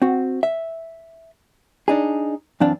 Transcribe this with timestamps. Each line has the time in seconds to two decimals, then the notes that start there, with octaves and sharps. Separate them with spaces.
0.02 C4 F#4
0.43 E5
1.88 D4 D#4 G#4
2.60 F#2 E3 C4 D4 F5 A5